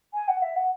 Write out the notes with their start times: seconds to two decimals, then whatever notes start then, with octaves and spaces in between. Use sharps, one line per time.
0.14 G#5
0.28 F#5
0.42 E5
0.56 F#5